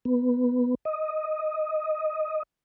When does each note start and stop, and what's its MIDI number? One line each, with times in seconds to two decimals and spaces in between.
0.05 0.75 59
0.85 2.43 75